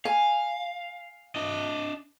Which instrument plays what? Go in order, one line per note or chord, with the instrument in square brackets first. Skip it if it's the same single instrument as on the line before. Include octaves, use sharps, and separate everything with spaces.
[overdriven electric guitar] F5 [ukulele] G#5
[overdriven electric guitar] D4 D#5